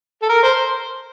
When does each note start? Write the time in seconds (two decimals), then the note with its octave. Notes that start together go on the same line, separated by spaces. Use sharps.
0.22 A4
0.29 A#4
0.43 C5